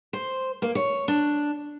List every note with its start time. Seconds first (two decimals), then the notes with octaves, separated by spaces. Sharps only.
0.13 C5
0.62 A#3
0.75 C#5
1.08 D4